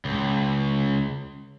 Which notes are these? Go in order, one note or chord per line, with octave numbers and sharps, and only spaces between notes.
C#2